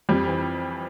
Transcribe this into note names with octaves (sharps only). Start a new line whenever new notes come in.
F2 G3
E3